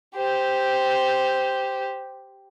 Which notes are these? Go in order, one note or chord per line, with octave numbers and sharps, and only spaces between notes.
G4 C5